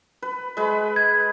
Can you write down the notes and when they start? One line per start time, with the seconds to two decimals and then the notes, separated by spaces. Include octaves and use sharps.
0.22 B4
0.57 G#3 B4 B5
0.96 G#6